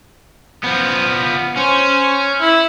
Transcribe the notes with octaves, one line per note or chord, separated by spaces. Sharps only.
F3 B3
C#4 C5
E4